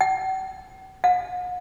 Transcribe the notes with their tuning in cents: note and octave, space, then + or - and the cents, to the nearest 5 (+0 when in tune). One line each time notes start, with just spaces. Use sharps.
F#5 +45
F#5 -40